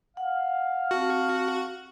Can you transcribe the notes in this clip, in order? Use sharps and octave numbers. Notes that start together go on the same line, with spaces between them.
F5 F#5
C4 F#4 A5